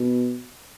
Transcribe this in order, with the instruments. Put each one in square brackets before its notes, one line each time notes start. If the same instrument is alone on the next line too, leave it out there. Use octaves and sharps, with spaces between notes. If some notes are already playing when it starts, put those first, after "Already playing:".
Already playing: [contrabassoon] B2